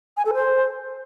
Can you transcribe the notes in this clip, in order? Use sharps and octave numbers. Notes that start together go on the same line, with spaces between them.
G#5
A4
C5